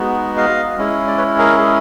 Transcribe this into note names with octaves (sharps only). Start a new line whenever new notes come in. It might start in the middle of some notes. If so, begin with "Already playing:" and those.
Already playing: G#3 B3 D#4 F#4
D#5 F5
G#3 C#4 E4
D5
B4 C#5
G#4 A#4